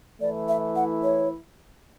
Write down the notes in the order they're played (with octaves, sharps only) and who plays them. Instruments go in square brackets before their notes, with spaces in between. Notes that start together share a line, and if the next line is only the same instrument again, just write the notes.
[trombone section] E3 A3 E4 [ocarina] D5
[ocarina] E5
F#5
C#5